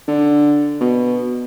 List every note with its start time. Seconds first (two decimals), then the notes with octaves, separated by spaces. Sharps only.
0.08 D3
0.81 B2